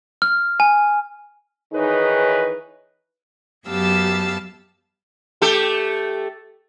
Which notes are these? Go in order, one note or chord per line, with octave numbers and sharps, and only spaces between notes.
F6
G#5
D#3 E3 D#4 G#4 B4 C#5
F#2 B3 G4 F5 A5 E6
A3 G4 A4